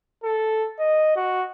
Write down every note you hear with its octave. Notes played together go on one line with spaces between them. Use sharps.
A4
D#5
F#4